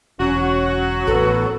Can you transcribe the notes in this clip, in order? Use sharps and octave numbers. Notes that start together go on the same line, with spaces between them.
E1 F#3 C#4 F#4
A1 B3 A4